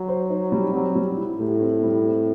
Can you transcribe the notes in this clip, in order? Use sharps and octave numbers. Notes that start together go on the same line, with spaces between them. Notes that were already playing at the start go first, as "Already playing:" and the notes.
Already playing: F#3
C5
D#4
G3
F#3 C4
G3
E4
A2 G4
C4
G3
C4